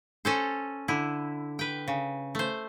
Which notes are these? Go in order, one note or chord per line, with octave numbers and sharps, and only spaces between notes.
C#4 A4 C5
D3 E4
B4 G5
C#3
A3 C5